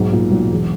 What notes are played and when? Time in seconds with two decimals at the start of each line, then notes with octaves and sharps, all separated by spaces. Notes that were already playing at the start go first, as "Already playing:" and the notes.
Already playing: B1 G#2
0.12 A#2
0.32 B1
0.51 E1